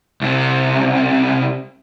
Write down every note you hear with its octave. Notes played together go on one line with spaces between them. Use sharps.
C2 C3